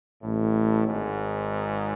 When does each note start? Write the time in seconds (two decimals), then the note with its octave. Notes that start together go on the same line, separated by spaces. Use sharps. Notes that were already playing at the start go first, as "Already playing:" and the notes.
0.23 A1 A2
0.87 G#1 G#2